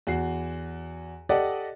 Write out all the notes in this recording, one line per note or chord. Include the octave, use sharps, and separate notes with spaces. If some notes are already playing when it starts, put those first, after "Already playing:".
E2 F#4 C7
G4 A4 D5 D#5 F#5